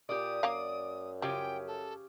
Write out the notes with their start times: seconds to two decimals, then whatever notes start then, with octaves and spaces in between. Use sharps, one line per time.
0.09 A#2 G4 D5 D#6
0.43 F#2 A#3 D5 F5
1.22 C#3 F3 G4 G5 G#5
1.67 A4